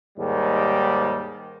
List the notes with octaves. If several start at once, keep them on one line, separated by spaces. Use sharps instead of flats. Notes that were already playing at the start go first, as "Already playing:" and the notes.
D#2 G#2 D#3 G3